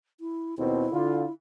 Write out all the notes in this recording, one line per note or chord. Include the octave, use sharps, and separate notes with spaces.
E4
D#2 B2 C4 E4
D3 F4